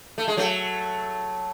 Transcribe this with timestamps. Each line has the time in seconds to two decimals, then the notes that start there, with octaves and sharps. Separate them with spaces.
0.18 A3
0.28 G#3
0.37 F#3 A3